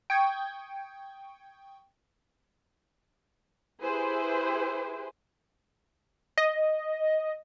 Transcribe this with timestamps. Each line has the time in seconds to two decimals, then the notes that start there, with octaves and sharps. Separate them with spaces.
0.10 G5 C#6 D#6 G#6
3.82 E4 G4 G#4 B4 C5
6.38 D#5